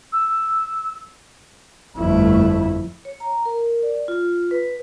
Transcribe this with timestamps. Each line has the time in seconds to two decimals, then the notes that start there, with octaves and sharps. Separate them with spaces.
0.13 E6
1.97 G1 F2 A3 E4
3.05 C#5
3.20 A#5
3.45 A#4
3.83 D5
4.08 F4
4.51 B4